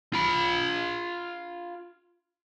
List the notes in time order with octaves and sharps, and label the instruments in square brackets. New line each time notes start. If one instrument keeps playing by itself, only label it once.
[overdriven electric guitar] F4 B5